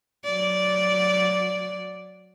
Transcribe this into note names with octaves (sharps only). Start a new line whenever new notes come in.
F#3 D5